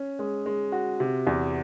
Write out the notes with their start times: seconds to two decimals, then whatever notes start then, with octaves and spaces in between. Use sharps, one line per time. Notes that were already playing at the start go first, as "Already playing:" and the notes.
Already playing: C#4
0.19 G#3
0.46 G#3
0.72 F#4
1.00 C3
1.27 E2